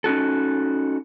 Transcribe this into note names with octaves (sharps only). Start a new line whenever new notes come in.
C#4 D#4 F#4 A4